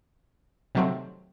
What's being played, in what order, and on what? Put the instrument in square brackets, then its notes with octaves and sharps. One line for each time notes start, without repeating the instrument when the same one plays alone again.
[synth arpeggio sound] C3 D#3 F#3 A3 C4